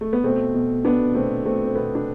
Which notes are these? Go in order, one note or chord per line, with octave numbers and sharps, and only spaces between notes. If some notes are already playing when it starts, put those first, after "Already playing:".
A3
B3
B2 A3 C4
B2
B2 B3 D4
B2 A3 C4
B2 A3 C4
C4
B2 B3
D4